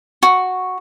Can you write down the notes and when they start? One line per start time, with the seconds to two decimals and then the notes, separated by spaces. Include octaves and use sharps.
0.23 F#4